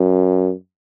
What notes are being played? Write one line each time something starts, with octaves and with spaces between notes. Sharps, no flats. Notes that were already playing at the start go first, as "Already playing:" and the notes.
Already playing: F#2